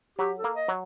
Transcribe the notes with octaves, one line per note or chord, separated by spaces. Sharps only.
F#3 G4
A4
A#3
D#5
F#3